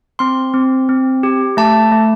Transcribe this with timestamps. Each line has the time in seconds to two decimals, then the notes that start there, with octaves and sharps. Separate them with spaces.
0.19 C4 C6
0.54 C4
0.89 C4
1.23 G4
1.57 A3 A5
1.92 A3